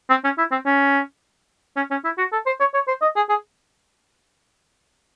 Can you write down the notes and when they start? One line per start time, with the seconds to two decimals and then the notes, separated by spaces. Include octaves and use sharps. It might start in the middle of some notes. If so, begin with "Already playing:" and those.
0.10 C4
0.24 C#4
0.38 E4
0.52 C4
0.66 C#4
1.77 C#4
1.91 C#4
2.04 E4
2.18 F#4
2.32 A4
2.46 C5
2.60 C#5
2.74 C#5
2.88 C5
3.02 D#5
3.16 G#4
3.29 G#4